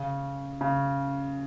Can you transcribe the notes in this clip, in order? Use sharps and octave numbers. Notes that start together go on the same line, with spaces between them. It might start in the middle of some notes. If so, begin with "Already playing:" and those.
Already playing: C#3
C#3